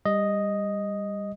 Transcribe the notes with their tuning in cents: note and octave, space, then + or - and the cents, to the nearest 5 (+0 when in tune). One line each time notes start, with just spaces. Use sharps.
G3 +20 D#5 +0